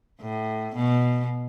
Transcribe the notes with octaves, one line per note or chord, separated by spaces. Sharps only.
A2
B2